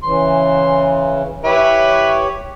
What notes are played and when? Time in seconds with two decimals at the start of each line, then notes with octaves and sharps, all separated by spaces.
0.04 C#3 E3 C6
1.44 E4 G4 B4 C#5